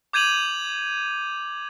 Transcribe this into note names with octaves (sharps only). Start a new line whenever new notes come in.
D6 G6 G#6 D#7 F7 F#7